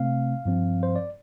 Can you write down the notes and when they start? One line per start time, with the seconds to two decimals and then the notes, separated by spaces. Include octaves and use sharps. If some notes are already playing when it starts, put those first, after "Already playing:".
Already playing: C3 A3 C4 F5
0.45 G2 F3 C4
0.83 C5
0.96 D5